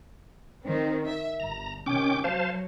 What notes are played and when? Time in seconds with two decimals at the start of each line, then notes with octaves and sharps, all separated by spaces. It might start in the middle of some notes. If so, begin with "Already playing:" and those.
0.63 D#3 C4
1.05 E5
1.40 G1 A#5
1.86 C3 D#3 C#4 G5 D6
2.24 F#3 C5 F5 A5